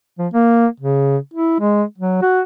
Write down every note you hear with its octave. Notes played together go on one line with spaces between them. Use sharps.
F3
A#3
C#3
E4
G#3
F#3
F#4